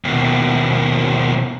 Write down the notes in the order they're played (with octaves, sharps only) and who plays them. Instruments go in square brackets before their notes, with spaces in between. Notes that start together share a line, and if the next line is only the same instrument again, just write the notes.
[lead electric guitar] D#2 B2